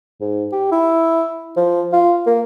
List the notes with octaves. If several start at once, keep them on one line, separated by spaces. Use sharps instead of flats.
G#2
G4
E4
F3
F4
A#3